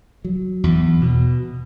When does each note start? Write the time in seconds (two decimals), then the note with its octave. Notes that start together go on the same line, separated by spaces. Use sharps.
0.25 F#3
0.64 E2
1.02 B2